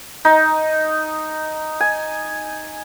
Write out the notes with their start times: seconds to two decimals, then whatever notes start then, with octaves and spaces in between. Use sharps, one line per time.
0.25 D#4
1.80 G#5